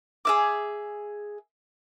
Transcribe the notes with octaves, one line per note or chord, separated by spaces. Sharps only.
G#4 E5 D6